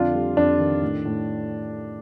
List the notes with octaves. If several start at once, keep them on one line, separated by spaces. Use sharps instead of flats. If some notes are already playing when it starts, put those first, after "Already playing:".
Already playing: F2 D3 D4 F4
G3
F2 D4
D#3
A2
A2